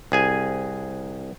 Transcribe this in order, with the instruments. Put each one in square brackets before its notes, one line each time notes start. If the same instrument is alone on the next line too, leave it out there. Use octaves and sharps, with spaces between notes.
[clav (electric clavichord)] C2 G#4 G#5